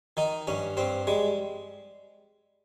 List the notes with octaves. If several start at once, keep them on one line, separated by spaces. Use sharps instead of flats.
D#3 D#4
G2 C#4
G2 C4
G3 G#3